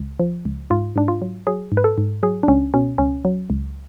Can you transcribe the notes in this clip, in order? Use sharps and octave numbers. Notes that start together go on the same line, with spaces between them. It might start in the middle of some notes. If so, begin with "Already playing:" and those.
Already playing: C#2
F3
C#2
G#2 F4
G#2 D4
F4
F#3
F#3 G#4
G#2
B4
A4
G#2
F#3 G#4
D4
C#2 C#4
B2 C#4
C#2 C#4
F#3
C#2